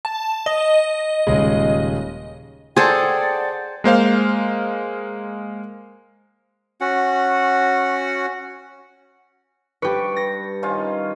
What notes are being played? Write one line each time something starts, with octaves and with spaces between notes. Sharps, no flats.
A5
D#5
D#1 C#3 G#3
G#4 A4 C5 D5 F#5 G5 A5 C6
G#3 A#3 C5 F5
C#4 F#4 F#5
G2 G4 B4 C#6
A#6
D#3 C#4 F4